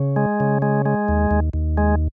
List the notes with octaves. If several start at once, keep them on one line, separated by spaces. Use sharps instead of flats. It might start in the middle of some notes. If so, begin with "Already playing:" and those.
Already playing: C#3
G#3
C#3
G#3
G#3
D#2
D#2
D#2
G#3